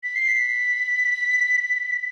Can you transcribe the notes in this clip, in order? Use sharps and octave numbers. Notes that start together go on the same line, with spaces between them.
B6
C7
B6